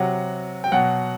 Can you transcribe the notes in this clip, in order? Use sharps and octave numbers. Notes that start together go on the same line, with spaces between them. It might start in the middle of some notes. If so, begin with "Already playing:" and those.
Already playing: C3 F#3 F#5
G5
B2 F#3 F#5